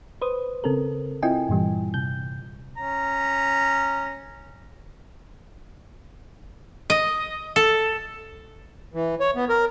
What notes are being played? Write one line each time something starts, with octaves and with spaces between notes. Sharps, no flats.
B4 C5 D#6
C#3 C4 A4 A#4
C4 E4 F4 D#5 G5 G#5
G2 A#2 E3 G3
C3 G6
C#4 A#5
D#5
A4
E3
C#5
B3
A#4